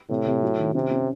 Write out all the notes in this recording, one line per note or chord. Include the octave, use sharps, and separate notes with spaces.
A2 C3
C3
F#3
D#3
C3 C#4
C#4